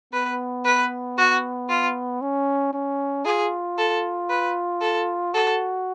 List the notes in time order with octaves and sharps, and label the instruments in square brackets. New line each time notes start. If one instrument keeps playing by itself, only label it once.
[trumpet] B3 [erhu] B4
[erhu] B4
F#4
F4
[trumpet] C#4
C#4
[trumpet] F4 [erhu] G#4
[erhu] A4
B4
A4
[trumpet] F#4 [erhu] A4